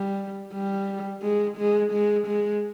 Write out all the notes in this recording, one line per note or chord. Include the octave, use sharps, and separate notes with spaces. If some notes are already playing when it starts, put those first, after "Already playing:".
Already playing: G3
G3
G#3
G#3
G#3
G#3